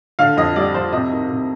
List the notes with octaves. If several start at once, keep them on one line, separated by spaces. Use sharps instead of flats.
D3 F5
F2 D#5
G3 D5
F2 C5
C3 D#5
D#3
C3